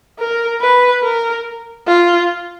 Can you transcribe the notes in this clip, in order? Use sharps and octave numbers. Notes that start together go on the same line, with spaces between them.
A#4
B4
A#4
F4